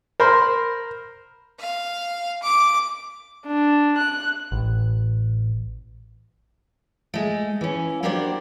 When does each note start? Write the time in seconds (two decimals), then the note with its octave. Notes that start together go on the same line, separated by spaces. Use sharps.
0.20 A#4 C5 B5
1.59 F5
2.43 D6
3.46 D4
3.97 F#6
4.52 A1
7.14 G#3 A3
7.61 E3 C#4
8.03 F#3 A#3 D4 G4 C5 D5